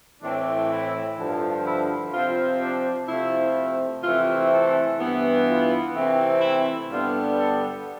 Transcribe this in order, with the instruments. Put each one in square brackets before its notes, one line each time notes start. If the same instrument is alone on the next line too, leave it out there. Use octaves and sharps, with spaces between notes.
[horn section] A2 E3 A3 C4 D4
E4
G2 D3 F3
E4
C3 F3 C4 F4
D4
C3 F3 A3 E4
C3 E3 A3 C4 F4
A4
G2 E3 B3
F4
C3 E3 A3 C4
E4
G2 D3 G3 B3 F4
A4